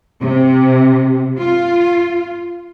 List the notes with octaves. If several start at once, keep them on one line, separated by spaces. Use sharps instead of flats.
C3
F4